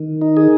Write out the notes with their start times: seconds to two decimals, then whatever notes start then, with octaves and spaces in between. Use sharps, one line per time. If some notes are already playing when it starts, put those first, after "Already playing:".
Already playing: D#3
0.22 D#4
0.37 G#4